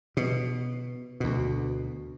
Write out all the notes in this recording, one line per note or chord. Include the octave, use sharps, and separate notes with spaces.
B2
D2 B2